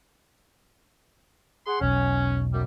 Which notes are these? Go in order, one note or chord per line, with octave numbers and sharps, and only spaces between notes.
G#4 F#5 C6
E1 B1 C#4
F#2 G3